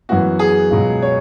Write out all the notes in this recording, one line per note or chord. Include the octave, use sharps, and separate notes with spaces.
F#2 E3 B3 F#4
G#4
C#2 B2 F#3
C#5